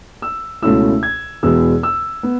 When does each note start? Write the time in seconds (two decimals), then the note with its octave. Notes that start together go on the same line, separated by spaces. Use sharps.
0.22 E6
0.62 C#2 B2 A3 C#4 E4 E6
1.03 G#6
1.43 E2 B2 G#3 B3 E6
1.83 E6
2.23 B3